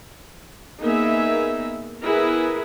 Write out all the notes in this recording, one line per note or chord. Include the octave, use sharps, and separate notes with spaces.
A#3 B3 D#4 G#4 A#4 E5
B3 E4 G#4 A#4 B4